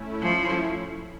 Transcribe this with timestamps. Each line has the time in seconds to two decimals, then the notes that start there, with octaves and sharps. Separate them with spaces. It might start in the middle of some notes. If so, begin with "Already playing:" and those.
Already playing: A3 C#4 E4
0.22 F3